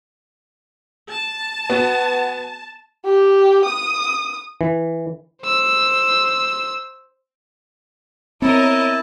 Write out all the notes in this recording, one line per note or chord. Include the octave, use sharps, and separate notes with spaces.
A5
B3 F#4
G4
D#6
E3
C5 E6
B3 C4 E4 A#4 C#5 D#5 A5 B5